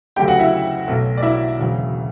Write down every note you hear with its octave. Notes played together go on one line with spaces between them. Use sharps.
D2 C#3 F#3 A3 G4 G5
F#4 F#5
E4 E5
B1 B2 F#3 A3
D5
E4 E5
E1 D2 C#3 F#3